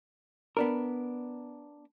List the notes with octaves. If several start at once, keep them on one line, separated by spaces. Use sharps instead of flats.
B3 D4 A#4